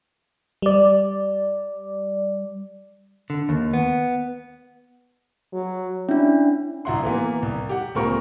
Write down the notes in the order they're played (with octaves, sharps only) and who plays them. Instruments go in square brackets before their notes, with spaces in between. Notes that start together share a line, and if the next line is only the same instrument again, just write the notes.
[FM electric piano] G3 D5
[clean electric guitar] D3
D#2
B3
[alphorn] F#3
[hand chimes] C#4 D4 [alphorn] E4
[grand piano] C2 F#3 E4 F#5 C6
E3 A#3 B3
C2
G4 F#5
C#2 A#2 C4 A#4 C#6